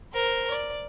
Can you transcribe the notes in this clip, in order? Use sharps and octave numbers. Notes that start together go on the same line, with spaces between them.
A#4 C5
D5